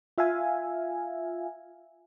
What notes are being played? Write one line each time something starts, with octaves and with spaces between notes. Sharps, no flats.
F4 E5 F5 G#5